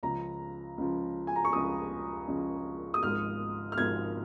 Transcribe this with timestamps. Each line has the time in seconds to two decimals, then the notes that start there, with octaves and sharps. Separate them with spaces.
0.03 C#2 C#3 F3 A#5
0.78 C#2 C#3 F3
1.27 G#5
1.36 A#5
1.45 C#6
1.53 C#2 C#3 F3 D#6
2.28 C#2 C#3 F3
2.94 D#6
3.03 G#1 G#2 F3 F6
3.72 F6
3.78 G#1 G#2 F3 G#6